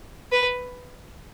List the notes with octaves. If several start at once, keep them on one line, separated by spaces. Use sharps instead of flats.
B4